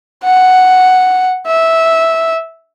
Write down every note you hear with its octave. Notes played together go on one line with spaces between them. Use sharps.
F#5
E5